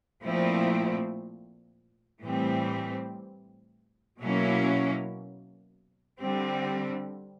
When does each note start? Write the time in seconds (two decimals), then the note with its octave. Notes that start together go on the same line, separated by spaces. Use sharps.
0.23 A#2 F3 A3 C4 E4
2.22 A2 E3 G3 C4
4.21 B2 F#3 A#3 C#4 E4
6.20 D3 G3 C4